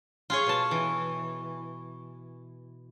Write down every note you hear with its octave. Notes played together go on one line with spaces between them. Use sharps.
F4 G#4 C#5
B2 A5
E3